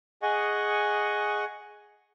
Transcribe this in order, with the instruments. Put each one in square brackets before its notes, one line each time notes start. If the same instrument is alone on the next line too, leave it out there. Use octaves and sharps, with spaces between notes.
[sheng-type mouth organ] G#4 D#5 F#5 G#5 C#6